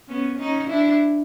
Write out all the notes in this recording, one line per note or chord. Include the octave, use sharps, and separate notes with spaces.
B3 C#4
C#4 D#4
D4 E4